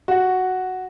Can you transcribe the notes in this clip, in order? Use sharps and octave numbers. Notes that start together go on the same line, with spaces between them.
F#4 F#5